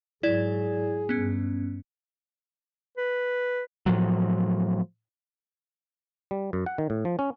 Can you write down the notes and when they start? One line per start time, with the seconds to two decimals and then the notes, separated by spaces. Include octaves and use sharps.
0.23 G#2 F#3 E4 G#4 D5 G#6
1.09 G2 B3 C#4
2.98 B4
3.86 A2 F3 F#3
6.31 G3
6.53 F#2
6.66 F#5
6.78 D#3
6.90 A2
7.05 F3
7.19 C#4